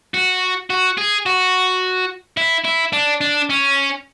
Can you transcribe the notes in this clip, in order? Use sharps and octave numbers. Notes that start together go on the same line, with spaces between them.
F#4
F#4
G#4
F#4
E4
E4
D4
D4
C#4